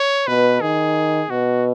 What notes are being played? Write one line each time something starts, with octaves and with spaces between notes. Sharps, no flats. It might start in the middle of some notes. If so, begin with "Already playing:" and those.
Already playing: C#5
B2 B4
D#3 G#4
B2 F#4